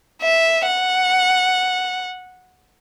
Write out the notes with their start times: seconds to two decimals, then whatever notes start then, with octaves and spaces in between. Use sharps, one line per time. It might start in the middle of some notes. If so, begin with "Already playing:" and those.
0.22 E5
0.67 F#5